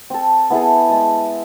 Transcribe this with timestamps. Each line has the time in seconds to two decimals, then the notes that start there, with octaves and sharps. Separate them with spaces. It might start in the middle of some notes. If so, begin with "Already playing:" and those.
0.10 C4 A4
0.50 B3 E4 G#4 A4
0.89 G#3 A5